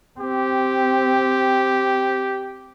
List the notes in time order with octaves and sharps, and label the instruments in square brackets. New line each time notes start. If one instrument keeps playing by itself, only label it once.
[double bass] C4 [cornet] G4